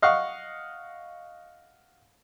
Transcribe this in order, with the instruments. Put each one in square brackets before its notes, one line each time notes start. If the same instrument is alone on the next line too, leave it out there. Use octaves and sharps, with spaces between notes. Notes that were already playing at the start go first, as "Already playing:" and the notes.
[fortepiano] D#5 F5 F#5 C#6